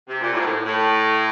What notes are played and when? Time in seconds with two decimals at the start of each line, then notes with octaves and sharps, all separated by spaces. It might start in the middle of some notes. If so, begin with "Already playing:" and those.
0.08 C3
0.21 A#2
0.33 A2
0.39 G#2
0.45 A2
0.64 A2